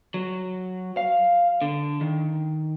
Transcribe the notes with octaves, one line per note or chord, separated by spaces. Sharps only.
F#3
F5
D3
D#3